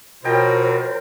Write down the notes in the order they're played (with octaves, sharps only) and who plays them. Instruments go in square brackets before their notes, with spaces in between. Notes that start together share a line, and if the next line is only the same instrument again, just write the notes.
[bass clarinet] B2 [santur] F3 G5 A#5 [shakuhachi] A#4 [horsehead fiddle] C5 C#5